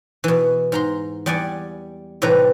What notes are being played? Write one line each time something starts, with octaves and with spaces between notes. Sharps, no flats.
B2 E3
G#2 A#5 C6
E2 G3 D5 F#5 G#5
A2 C3 E3 G3 B4 A#5